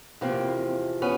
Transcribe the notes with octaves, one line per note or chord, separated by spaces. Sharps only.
E2 C3 F3 A#3 C4
B3 C#4